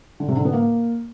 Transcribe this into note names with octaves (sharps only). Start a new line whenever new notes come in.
D3
C3
D3
B3
A#3